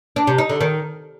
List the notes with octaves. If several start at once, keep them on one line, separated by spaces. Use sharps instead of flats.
D4
C3
D#4
D3
D#3